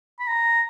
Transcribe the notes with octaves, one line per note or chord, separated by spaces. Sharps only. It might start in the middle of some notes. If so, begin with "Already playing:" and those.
B5
A#5